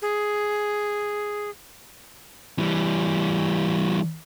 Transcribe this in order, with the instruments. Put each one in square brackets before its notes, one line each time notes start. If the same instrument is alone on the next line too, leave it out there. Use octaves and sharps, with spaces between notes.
[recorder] G#4
[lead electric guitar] E3 G3